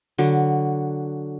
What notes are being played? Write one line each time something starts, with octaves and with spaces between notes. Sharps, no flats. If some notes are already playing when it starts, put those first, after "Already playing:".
D3 F#3